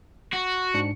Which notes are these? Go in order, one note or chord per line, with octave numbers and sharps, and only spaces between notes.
F#4
G#2 D4 C#7